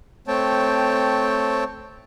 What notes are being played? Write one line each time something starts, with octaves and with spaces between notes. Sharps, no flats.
A3 C4 C#5 G5 A5